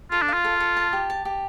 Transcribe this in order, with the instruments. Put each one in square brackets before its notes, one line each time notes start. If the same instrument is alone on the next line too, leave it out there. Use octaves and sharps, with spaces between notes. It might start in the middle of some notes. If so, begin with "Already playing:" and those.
[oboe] F4 [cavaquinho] A4
[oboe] D4
[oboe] F4 [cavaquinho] F5
[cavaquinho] A4
A4
A5
G4
A5
G4